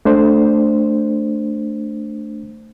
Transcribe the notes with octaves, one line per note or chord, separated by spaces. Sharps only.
A3 D4 C5